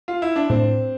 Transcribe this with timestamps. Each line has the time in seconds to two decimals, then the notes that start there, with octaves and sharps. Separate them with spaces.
0.08 F4
0.22 E4
0.36 D4
0.50 A2 C4